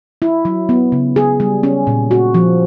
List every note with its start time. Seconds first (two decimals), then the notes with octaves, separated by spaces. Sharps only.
0.22 E4
0.45 F#3
0.69 B3
0.92 C#3
1.16 G#4
1.40 G3
1.63 C#4
1.87 A#2
2.11 F#4
2.34 F3